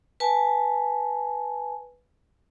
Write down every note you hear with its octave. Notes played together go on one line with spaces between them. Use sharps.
B4 G#5 A5